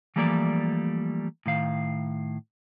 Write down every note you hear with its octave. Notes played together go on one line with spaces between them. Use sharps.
E3 F3 G3 A3 A#3 D5
A2 D#3 F5